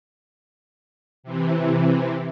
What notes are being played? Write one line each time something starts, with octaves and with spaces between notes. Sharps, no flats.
C3 E3